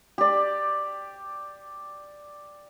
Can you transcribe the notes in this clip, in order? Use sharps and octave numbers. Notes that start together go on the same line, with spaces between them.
G4 D5